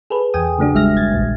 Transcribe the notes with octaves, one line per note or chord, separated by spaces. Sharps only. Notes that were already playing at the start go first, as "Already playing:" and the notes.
G#4 A4 B4
E2 G5 G#5 D#6
C#3 F#3 A3 D4 F#4
G#1 G3 G#3 E5 F6 A#6
G1 G#6 A6
A#1 D#2 A#2